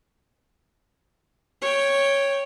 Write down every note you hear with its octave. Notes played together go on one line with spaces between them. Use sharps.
C#5 G5